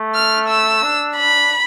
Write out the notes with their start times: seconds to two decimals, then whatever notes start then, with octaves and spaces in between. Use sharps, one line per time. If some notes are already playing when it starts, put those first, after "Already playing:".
Already playing: A3
0.15 F6
0.49 E6
0.83 D4
1.17 B5